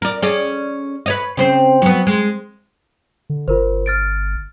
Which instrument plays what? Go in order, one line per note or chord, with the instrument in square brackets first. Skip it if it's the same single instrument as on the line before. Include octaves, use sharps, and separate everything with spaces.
[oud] A#4 D5
C#4 G#4 D5
B4 C#5 D#5
C#3 C4 C5
F#3 B3
G#3
[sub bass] D3
[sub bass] G1 [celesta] F4 A#4 C5
[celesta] F6 A6 D7